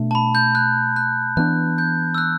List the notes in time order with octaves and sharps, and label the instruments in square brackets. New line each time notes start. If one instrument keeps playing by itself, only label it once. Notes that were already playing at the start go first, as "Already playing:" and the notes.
Already playing: [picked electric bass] B2 A3 D4
[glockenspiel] A5
B5
G6
F#6
F#6
[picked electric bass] E3 B3 D4 [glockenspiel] F#6
[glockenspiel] G6
E6
F#6